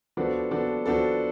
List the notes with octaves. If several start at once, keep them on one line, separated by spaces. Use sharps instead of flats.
F3 B3 D4 F#4 A4
F3 B3 D4 F#4 A4
F3 B3 D4 F#4 A4